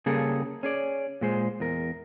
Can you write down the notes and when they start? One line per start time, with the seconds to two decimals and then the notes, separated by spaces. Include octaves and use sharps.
0.06 C#3 G3 A#3 G#4 A4
0.63 C#4 G#4 D5
1.21 A#2 G#3 C5
1.60 E2 A#4